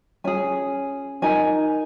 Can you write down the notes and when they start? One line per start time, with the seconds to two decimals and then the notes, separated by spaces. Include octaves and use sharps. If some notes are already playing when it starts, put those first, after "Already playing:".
0.24 C#4 G#4 G#5
1.22 D#4 A#4 G#5